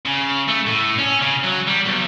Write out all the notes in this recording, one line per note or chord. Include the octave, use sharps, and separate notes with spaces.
C#3
A3
A2
C#4
C#3
F#3
G3
B1